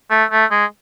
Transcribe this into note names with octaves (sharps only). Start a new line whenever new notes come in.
A3
A3
G#3